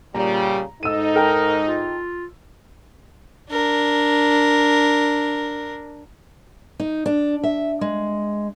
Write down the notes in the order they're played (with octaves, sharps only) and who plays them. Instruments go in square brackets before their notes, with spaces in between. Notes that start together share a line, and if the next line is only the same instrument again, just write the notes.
[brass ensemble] A#2 C#3 G3 [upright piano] A#5
[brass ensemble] G#2 D#4 [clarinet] A4 [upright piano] E6 D#7
[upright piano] A4 G5 A#5 [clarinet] A#4
[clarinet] F4
[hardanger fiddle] D4 A#4
[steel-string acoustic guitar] D#4
D4
E5
G#3